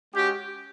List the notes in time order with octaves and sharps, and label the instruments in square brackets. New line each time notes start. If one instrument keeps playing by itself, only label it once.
[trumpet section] G#3 C#4 F#4 G4